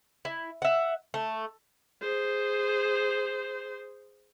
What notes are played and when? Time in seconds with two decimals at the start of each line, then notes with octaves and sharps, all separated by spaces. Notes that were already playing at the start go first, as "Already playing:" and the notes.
0.25 E4
0.62 E5 F#5
1.14 A3
2.01 G#4 C5